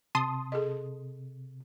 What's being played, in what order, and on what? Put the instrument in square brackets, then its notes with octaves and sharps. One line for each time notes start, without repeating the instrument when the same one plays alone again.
[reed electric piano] C3 [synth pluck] A5 C6 D#6
[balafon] G#4 A4 D#5